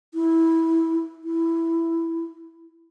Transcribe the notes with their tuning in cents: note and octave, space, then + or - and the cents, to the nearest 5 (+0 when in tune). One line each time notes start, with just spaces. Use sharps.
E4 -10
E4 +5